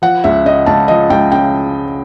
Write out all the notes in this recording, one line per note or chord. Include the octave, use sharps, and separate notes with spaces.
F3 F#5
C#2 E5
C#3 D#5
C#2 A5
F3 D#5
C#2 G5
C#3 G5